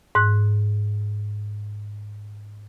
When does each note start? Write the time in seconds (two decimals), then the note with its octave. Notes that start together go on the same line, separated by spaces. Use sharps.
0.15 G#2 F#6